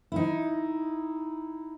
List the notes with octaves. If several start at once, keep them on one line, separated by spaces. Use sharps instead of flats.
D#4 E4